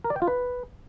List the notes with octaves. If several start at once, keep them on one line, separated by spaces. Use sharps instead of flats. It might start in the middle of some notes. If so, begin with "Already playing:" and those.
A#4
D5
G5
F4
B4